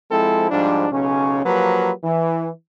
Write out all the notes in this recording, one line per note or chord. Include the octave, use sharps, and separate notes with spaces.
F3 G#3 C4 E4 A4
G#2 F3 G3 D4
B1 C#3 C#4
F3 F#3 A#3 G4 B4
E3